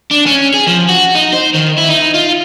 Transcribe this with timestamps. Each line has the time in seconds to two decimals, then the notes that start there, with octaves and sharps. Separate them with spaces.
0.11 D4
0.26 C#4
0.54 G#4
0.67 F3
0.89 F#4
1.15 D#4
1.33 C5
1.54 D#3
1.78 E4
1.89 D#4
2.14 F4